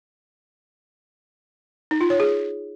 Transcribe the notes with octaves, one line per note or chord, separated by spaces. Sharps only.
D#4
F4
C#5
G#4